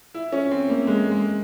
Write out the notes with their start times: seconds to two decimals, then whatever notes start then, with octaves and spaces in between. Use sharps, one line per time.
0.14 E4
0.33 C#4
0.51 C4
0.70 A#3
0.87 G#3
1.11 G#3